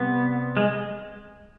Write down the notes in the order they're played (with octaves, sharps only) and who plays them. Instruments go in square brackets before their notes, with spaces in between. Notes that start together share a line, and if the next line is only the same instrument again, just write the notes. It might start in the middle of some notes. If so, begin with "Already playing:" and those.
Already playing: [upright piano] C3 G3 C4 [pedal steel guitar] B3
[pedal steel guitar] G#3